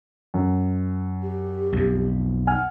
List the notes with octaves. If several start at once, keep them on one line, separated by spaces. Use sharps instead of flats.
F#2
G4
B1 F2
F#5 G#5 F6